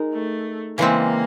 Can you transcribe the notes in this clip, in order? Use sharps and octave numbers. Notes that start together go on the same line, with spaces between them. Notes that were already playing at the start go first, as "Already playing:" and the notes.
Already playing: G#3 D#4 A#4
A3
C#3 E3 G#3 A#3 C4